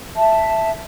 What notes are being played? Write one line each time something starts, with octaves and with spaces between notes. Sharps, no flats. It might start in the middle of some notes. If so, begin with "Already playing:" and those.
E5 A5